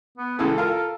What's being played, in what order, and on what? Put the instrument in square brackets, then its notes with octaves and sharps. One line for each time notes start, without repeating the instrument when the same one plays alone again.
[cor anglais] B3
[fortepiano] C#2 C#3 E3 [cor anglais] A4
[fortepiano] F4 A#4